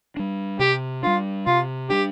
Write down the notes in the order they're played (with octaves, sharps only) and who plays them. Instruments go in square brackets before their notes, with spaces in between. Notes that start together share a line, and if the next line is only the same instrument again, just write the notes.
[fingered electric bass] G3 D4
[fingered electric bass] C3 [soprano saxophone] G4
[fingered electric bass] G3 D4 [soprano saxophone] F4
[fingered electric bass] C3 [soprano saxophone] F4
[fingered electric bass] G3 D4 [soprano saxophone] G4